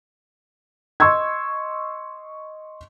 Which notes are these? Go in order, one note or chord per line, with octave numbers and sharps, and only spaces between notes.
D#5 C6 C#6 E6 G#6